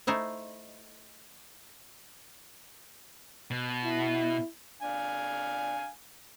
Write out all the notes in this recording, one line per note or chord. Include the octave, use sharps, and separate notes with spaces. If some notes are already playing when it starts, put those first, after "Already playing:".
A3 D#4 E4 C5
B2
E4
D4 F5 G#5